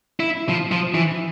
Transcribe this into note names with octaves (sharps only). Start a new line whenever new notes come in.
E4
F3
F3
E3